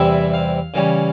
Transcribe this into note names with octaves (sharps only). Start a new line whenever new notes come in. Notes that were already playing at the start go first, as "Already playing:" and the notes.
Already playing: E2 C3 G3 C4 E4 E5
F5
C#3 E3 G3 C#4